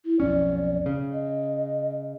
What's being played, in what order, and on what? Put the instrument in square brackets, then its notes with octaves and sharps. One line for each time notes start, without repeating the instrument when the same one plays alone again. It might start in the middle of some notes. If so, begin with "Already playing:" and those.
[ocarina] E4
[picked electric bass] B1 F2 C#4 [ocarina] D5
[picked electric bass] C#3
[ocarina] D#5